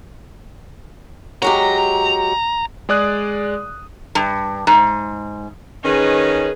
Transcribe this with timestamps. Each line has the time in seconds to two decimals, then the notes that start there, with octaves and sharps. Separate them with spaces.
1.42 F#3 G#3 G4 A#5
2.89 G#3 G#4 D5 D#6 F#6
4.15 G2
4.67 G#2
5.84 D#3 C#4 G#4 B4